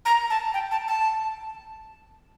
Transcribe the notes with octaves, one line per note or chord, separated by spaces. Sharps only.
A#5
A5
G5
A5
A5